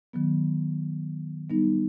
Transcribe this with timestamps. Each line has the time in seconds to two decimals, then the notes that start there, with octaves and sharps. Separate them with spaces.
0.13 D#3 F#3 B3
1.50 G3 B3 D#4